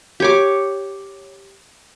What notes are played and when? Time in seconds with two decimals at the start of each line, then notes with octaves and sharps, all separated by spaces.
0.20 G4 C#5 D6